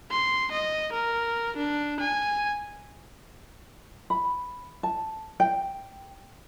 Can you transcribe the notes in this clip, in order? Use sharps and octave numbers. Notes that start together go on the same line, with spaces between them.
C6
D#5
A#4
D4
G#5
B5
A5
G5